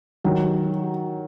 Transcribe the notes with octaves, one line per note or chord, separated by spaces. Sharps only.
D#3 F#3